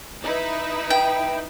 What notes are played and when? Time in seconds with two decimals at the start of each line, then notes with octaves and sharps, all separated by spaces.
0.22 D#4 E4 B4
0.90 G5